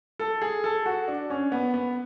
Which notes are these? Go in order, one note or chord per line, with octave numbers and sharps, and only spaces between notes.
A4
G#4
A4
F#4
D4
C#4
B3
B3